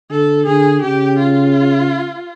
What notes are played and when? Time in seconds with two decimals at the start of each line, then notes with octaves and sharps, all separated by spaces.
0.10 D3 A4
0.46 D3 G#4
0.82 C#3 G4
1.19 F4